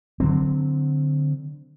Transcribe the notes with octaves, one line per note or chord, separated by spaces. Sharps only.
D3 F#3 C4